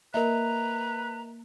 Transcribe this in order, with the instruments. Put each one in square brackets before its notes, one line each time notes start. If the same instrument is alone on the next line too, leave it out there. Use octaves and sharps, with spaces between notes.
[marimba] A#3 [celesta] A#4 D#5 E5 [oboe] B4 [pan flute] A#5